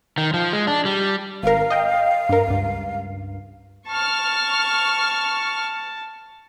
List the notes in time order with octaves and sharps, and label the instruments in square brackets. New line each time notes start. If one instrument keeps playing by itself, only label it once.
[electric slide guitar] D#3
F3
G#3
D4
G3
[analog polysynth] G#1 A#4 [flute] F5
[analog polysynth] D#5 G5
G2 A#4
C#2 G2
[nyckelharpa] A5 [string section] C#6 F6